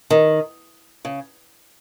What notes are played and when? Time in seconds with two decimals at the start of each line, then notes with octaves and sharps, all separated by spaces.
0.10 D#3
1.05 C#3